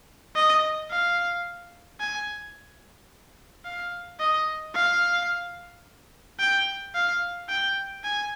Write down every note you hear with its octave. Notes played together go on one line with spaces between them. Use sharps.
D#5
F5
G#5
F5
D#5
F5
G5
F5
G5
G#5